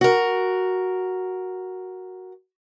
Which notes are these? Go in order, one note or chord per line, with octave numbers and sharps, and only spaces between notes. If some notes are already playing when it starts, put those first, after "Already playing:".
F#4 A#4